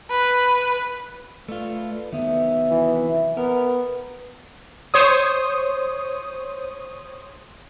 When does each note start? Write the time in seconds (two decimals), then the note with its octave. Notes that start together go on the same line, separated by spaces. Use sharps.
0.10 B4
1.49 A3 F4 A4 B4 D5
2.12 C2 D#3 F#3 B3 E5
2.70 E3
3.37 B3 A#4
4.94 C5 C#5 D#6